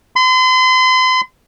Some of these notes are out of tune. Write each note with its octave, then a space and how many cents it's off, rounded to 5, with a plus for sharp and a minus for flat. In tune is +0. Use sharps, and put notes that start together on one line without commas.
C6 -40